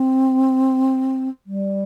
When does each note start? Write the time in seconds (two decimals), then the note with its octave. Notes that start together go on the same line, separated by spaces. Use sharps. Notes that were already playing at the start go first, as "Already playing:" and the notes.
Already playing: C4
1.46 G3